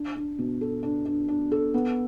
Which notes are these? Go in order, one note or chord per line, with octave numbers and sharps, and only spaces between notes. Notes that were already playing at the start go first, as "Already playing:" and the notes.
Already playing: D4
D4
B2
A4
D4
D4
D4
A4
B3